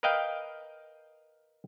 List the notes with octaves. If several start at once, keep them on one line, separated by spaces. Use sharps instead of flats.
A#4 B4 D#5 F5 G5